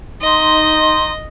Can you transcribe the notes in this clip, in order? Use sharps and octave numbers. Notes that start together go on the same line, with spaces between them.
D#4 D#5 C6